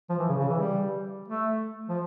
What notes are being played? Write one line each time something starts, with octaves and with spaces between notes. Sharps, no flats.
F3
E3
C#3
C#3
E3
G3
A3
F3